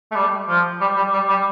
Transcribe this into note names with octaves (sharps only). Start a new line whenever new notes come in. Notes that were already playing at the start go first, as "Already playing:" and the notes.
A3
G3
F3
G3
G3
G3
G3